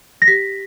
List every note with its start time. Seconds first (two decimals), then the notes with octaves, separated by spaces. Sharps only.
0.22 A#6
0.27 G4 B6